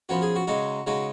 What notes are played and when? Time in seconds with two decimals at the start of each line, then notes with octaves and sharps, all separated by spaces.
0.09 F#2 F3 B3 F#4
0.22 G#4
0.36 F#4
0.47 C#3 G#3 D#4 F#4
0.86 C#3 G#3 D#4 F#4